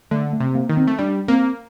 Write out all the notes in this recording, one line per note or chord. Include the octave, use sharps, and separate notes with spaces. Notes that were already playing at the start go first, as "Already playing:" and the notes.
D3 A3
A3
C3
A#3
D#3
C4
A3
G3 D4
A#3 C4